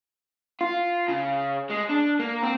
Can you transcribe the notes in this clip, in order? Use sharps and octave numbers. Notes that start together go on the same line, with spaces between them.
F4
C#3
G#3
D4
A#3
C4